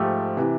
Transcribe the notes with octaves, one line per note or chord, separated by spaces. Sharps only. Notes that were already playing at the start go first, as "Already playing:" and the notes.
Already playing: G#2 F3 A3 G4
C3 E3